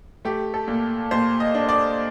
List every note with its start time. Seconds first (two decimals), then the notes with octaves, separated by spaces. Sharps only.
0.25 A3 G4
0.54 A4
0.68 A#2
1.11 A#2 C5
1.40 D#5
1.55 D4
1.69 D5